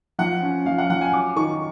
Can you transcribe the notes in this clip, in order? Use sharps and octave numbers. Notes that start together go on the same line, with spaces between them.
F3 F#5
C#4
F3 F5
F#5
F3 F#5
G#5
F#3 D6
D#3 C#6